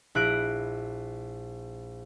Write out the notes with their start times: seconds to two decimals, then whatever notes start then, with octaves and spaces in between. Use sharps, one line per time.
0.15 A#1 E4 F#6 A#6 D7